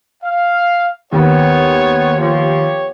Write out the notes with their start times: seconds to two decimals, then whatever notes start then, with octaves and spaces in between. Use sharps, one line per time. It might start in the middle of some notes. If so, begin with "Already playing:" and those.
0.23 F5
1.13 D#2 B3 C5 C#5
2.20 F3 G4 C#5